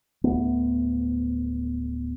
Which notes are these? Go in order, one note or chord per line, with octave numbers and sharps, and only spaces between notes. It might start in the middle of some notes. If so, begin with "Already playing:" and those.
D1 A3 B3